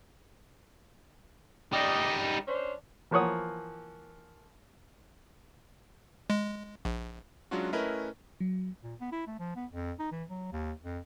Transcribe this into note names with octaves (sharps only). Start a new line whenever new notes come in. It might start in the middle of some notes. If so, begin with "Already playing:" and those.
G3 D#4 D5 D#5
C#4 D4 C5
E3 F3 A#3 C#5 F#5 D#6
G#3
A#1
F#3 G#3 C#4 D4 F4 F#4
A3 C#4 E4 A#4 B4 D#5
F#3
A#2
B3
E4
A3
F3
B3
F2
D#4
E3
F#3
D#2
F2